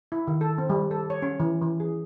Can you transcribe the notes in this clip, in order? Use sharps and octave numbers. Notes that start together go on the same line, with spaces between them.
E4
D#3
A4
C4
G3
A4
C#5
C#4
E3
E3
G#4